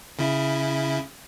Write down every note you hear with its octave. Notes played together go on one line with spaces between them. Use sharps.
C#3 E4